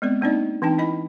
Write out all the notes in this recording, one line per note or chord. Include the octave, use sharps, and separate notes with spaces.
G#3 B3 C4 D5
A#3 C4 D4 D#4 D5 D#5
E3 C4 D4 D#4 G5 A5
E4 D#5 B5